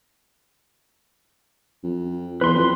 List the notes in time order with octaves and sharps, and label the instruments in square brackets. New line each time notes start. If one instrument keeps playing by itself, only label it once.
[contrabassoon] F2
[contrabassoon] E2 [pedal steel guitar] B4 C6
[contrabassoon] F2